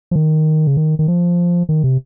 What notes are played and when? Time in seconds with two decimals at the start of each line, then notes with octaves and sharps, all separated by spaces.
0.11 F3
0.16 D#3
0.67 C#3
0.77 D#3
0.99 D#3
1.08 F3
1.69 D#3
1.84 C3